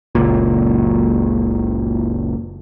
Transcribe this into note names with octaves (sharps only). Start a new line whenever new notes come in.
F#1 C#2 A#2